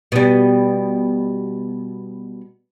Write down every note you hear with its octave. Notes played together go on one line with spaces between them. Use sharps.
B2 G3